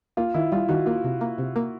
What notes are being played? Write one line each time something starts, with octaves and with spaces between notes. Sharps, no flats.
A#3 F4
D#3 E4
G3 F4
D#3 F#4
A#3 F4
C3
A#3
C3
A#3